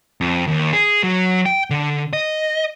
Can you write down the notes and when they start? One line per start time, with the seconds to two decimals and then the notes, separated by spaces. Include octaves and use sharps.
0.21 F2
0.47 D#2
0.73 G#4
1.03 F#3
1.46 G5
1.70 D3
2.13 D#5